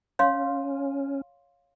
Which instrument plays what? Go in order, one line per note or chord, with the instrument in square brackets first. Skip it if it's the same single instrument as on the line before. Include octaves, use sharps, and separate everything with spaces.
[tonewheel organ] C#4 [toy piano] C#5 F5 C6